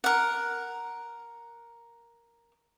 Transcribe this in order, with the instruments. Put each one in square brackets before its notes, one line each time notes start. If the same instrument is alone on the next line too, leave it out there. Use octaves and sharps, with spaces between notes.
[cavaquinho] A#4 F#5